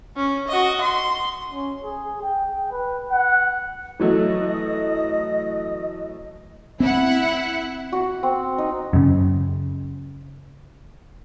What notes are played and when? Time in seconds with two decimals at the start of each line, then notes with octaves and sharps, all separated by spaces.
0.16 C#4
0.48 F#4 D#5
0.81 C6
1.51 C#4
1.84 G#4
2.22 G5
2.72 B4
3.12 F#5
4.00 E3 F#3 A3 D#5 D#6
6.80 C4 E4 F#5
7.92 F#4
8.23 C4
8.58 D#4
8.93 F#2 C#3